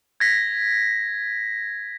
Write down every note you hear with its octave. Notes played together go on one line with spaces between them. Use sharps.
G#6 A#6 B6